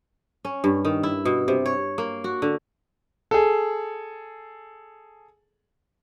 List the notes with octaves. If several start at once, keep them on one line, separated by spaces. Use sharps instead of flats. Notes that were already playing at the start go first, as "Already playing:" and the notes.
C#4
G2
D#3
E4
B2
C3
C#5
A#3
F#4
D3
G#4 A4